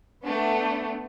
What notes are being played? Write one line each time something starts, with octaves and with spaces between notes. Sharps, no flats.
A3 B3 D4